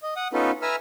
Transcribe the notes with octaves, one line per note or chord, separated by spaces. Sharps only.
D#5
F#5 D#6
B3 C#4 D#4 F4 A4 B4
B4 E5 G#5 A#5 E6 F6